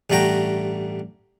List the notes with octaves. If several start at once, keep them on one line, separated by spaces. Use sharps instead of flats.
A1 G2 A3 F#4 G5 A#5